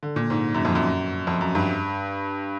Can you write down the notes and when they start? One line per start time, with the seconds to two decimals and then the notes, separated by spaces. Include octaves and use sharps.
0.03 D3
0.16 A#2
0.30 G#2
0.54 F#2
0.65 F2
0.75 F#2
1.27 F2
1.41 F#2
1.55 G2